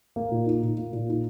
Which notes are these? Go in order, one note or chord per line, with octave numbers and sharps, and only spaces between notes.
A#3
A#2
D#4
A#2
A#3
A#2
D#4